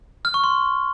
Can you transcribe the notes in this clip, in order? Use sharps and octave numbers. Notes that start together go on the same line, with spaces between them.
F6
C#6
C6